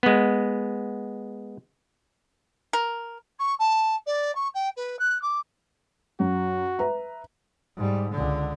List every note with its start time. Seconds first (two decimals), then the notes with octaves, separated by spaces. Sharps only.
0.03 G#3 B3
2.73 A#4
3.39 C#6
3.59 A5
4.06 D5
4.35 C#6
4.54 G5
4.76 B4
4.99 F#6
5.21 D6
6.20 F#2 F#4
6.79 B4 E5 A#5
7.76 G#2 G3
8.11 C#2 D3